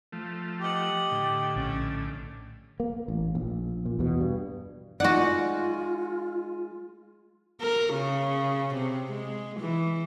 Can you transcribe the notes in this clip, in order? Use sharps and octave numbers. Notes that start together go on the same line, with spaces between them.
F3 A3
G4 D#5 F#5
A2 D3
A#1 C#4
A#3
A1
A#1
A#2
E2 B2
G2
G#3 D#4 F4 F#4 D5 F#5
A#4
C#3
C3
G#3
E3